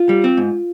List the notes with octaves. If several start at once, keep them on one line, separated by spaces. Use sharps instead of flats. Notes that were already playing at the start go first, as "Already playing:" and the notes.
Already playing: F4
G3
C4
G#2